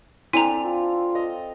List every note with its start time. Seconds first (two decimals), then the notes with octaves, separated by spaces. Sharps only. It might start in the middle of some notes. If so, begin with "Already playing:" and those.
0.33 C4 D4 E4 A4 G#5 A#5
0.65 F4
1.15 D#5 F5